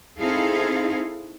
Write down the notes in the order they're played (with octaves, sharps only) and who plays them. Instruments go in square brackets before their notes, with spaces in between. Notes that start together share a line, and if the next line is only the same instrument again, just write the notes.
[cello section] C4 D#4 E4 G#4 A4 F5